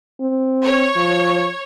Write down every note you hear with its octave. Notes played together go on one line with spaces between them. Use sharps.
C4
C#5
F3